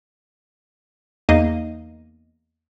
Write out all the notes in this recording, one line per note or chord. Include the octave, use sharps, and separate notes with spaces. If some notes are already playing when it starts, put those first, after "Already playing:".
E2 A#3 D#4 D#5 F5 D#7